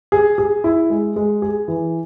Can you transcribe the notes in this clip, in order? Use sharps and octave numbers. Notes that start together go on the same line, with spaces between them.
G#4
G#4
E4
G#3
G#3
G#4
E3